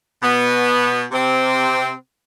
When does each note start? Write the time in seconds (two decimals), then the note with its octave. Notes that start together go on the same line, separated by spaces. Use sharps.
0.22 B2 B3
1.11 C3 C4